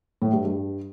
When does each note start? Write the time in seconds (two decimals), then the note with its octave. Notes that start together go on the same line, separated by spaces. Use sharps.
0.22 A2
0.33 G2
0.45 G2